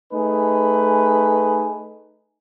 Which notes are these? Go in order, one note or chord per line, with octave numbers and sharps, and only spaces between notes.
A3 D#4 G#4 B4